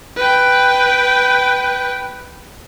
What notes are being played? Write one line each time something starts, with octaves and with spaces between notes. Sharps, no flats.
B4 G5